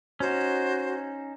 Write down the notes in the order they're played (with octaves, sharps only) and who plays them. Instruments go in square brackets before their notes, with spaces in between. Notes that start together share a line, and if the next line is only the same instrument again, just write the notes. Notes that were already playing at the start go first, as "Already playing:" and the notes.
[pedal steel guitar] C#4 D#4 [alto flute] F#4 [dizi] C5